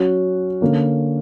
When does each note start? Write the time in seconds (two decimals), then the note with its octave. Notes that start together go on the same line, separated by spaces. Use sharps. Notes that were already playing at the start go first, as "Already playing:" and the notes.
Already playing: F#3 C#4 F#4
0.61 D3 A#3 C#4